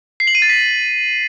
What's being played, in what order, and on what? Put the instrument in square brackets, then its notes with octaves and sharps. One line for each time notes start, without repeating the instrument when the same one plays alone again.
[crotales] C7
F#7
D#7
A6
B6